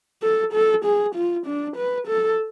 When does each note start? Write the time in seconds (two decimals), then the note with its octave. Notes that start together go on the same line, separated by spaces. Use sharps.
0.23 A4
0.53 A4
0.85 G#4
1.15 F4
1.46 D4
1.76 B4
2.08 A4